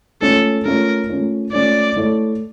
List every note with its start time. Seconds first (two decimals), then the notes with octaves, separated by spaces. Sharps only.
0.21 A3 C#4 F4 A4 C#5
0.65 A3 C#4 F4 A#4 C#5
1.09 A3 C#4 F4 C#5
1.52 A3 C#4 F4 C#5 D5
1.96 A3 E4 A4 C#5